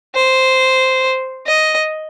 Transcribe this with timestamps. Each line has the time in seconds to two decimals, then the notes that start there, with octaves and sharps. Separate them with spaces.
0.16 C5
1.47 D#5